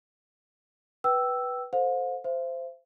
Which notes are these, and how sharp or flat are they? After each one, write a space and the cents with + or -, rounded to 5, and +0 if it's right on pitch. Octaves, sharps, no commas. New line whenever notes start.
B4 +0 G5 -25 E6 +0
A4 +10 C5 +0 F5 +45
C5 -10 E5 +45